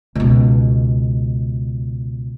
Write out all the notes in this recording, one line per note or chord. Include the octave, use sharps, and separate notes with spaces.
C#2 B2